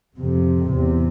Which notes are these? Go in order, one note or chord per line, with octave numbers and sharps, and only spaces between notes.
F2 C3
E2 C3